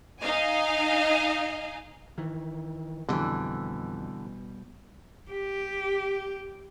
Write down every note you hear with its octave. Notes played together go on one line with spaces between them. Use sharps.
D#4 D#5 F5 G#5
D#3 E3
F2 B2 D3 E3 G3
G4